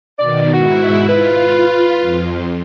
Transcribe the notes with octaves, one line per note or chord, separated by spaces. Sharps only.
B2 D#3 D5
G#2 E4 F#4
F4 B4
F2